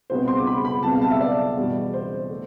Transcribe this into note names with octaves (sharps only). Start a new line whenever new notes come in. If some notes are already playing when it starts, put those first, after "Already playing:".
C2 B2 G3 B3 F4 C5
C6
D6
B5
B5
C2 B2 B3 A5
F5
A5
E5
D5
E2 B2 G3
C5
A3